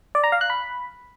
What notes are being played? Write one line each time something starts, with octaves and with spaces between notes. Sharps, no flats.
D5
A#5
F5
F#6
B5